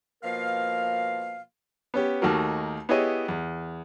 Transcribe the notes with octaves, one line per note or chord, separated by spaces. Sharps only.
B2 F3 A#3 A#4 F5
B3 C#4 G4
D#2 A3 D#4 F#4 A#4
B3 E4 G4 G#4 C#5 D#5
E2